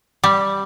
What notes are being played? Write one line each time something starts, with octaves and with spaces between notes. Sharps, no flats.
G3